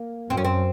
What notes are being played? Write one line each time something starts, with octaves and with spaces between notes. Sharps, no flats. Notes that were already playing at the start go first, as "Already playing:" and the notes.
Already playing: A#3
F#2 C4
C#4
C4